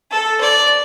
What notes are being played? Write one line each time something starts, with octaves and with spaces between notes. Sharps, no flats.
A4
D5